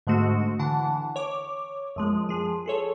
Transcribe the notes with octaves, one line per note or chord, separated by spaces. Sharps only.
G#2 D3 G#3 A3 F#4
D3 E3 F#5 A5
C#5 D6
F#2 F3 G#3
F3 G#4
G#4 A4 C#5